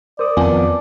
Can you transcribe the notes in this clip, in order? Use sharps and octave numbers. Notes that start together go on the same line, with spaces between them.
A#4 C5 D5 D#6
F2 D#3 B3 F4 G#5 A5 D6